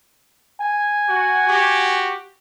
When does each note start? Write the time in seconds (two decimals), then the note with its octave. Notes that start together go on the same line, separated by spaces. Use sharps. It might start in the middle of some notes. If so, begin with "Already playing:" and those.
0.61 G#5
1.07 F#4
1.47 F#4 G4